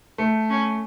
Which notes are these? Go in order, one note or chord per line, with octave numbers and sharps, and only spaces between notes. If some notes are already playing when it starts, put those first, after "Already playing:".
A3
C#4